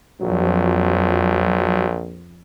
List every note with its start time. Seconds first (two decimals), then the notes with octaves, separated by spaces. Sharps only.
0.21 A#1 F2 F#3